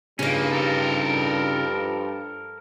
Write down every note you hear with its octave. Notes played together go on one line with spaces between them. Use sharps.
G2 C#3 F3 G3 A#3 C#4 D#4
A4 A#4